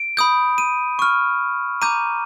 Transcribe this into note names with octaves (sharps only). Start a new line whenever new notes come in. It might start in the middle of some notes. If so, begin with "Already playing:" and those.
Already playing: D7
B5 D#6 G6
D#7
C#6 F6
A#5 D6 G6 D#7